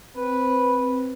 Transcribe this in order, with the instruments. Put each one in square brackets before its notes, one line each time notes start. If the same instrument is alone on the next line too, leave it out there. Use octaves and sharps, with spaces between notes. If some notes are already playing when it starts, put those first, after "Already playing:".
[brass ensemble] C4 [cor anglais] B4